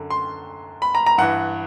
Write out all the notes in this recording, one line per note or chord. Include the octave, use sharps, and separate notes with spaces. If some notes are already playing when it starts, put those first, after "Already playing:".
Already playing: F#2 D3
C6
B5
A#5
A#5
G2 E3 F#5